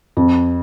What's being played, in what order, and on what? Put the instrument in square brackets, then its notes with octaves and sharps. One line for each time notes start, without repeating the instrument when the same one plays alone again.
[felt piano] F2